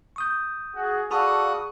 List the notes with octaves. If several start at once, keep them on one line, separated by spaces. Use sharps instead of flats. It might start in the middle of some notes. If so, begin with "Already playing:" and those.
C#6 D#6 G6
F#4 G#4
F#4 G#4 A4 D5 F5 A5 B5 D#6